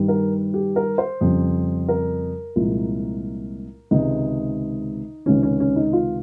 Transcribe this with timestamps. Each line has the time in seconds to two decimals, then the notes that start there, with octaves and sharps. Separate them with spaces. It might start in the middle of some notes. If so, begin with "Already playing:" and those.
Already playing: G2 D#3 G3
0.08 A#4
0.54 G4
0.76 A#4
0.98 C5
1.21 F2 C#3 G3
1.89 A#4
2.56 C2 A#2 F3 G#3
3.91 C#2 C3 D#3 G#3 D#4
5.26 C#2 C3 D#3 C#4
5.43 C#4
5.60 C#4
5.76 D#4
5.93 F4